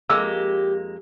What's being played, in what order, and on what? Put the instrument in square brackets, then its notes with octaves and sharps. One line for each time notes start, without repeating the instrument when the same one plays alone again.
[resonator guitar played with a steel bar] F2 G#3 A#3 [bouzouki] G4 [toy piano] E6